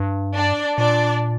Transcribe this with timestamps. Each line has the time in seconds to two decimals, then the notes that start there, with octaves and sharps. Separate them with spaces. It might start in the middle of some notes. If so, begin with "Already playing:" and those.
Already playing: G2
0.35 D4 D5
0.78 A#2 D4 D5